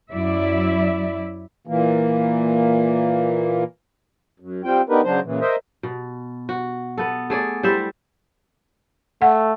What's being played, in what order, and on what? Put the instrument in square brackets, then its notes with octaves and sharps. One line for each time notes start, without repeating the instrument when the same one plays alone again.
[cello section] F#2 F#3 E4 D5 E5
[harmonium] A#2 E3 A#3
F#2
G3 C4 F4 G5
B3 D4 D#4 G4 A#4 B4
C#3 F#3 D4 C5
A#2 C#3 E3
A#4 C5 D#5 E5
[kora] B2
F#4
B3 A4
A3 G#4 D5
G3 E4 C5 E5
[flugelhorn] A3 [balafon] F#5